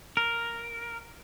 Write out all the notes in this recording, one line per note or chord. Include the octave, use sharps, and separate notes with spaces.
A#4